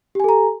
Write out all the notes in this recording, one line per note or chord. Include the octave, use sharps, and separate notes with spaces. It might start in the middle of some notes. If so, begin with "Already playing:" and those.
G4 A4 G#5 A#5